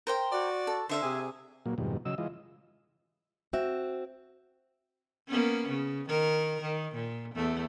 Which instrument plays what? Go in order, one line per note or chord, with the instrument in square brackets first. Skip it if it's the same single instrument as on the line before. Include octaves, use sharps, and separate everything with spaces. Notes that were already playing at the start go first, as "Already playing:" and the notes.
[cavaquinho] A#4 C5 G5
[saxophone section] F#4 D5
[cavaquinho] A4
[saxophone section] D3 [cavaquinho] C5 E5 F5
[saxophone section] C3 G#4
[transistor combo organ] A#2 F#3 A#3
F2 G#2 B2 D#3 G3
C#3 F#3 D#5 E6
E3 G#3 F4 D#5
[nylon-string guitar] C4 F#4 E5
[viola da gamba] A#3 B3 C#4
C#3
D#3 A#4
D#3
A#2
E2 A3